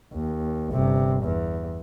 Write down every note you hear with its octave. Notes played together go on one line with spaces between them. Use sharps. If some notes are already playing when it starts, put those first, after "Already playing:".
D#2
G1 C3
E2